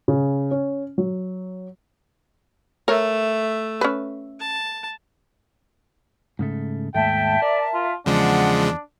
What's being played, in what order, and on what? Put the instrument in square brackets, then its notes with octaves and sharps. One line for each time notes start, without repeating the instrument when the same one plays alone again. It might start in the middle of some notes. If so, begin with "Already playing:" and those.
[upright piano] C#3
C#4
F#3
[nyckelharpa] A3 E5 [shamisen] A#4 C#5
[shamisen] C#4 B4
[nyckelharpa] A5
[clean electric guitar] G#2 C#3 A3
[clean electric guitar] D#2 G#2 A3 [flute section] E5 A5 [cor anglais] G5
[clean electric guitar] A#4 [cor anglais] D5
[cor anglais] F4
[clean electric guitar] E2 [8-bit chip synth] C#3 F3 G#3 [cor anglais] D4 [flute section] F#5